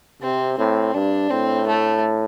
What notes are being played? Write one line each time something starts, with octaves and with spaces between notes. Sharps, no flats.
C3 C4
A2 C4
G2 D4
A2 C4
A3